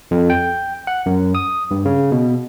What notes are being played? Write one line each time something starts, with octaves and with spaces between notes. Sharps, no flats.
F2
G5
F#5
F#2
D#6
G2
C#3
B2